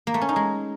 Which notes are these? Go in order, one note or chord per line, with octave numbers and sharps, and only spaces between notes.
A#3
A3
C#4
D#4
G#3